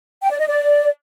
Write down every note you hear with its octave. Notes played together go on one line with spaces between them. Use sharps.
G5
D5
D#5
D5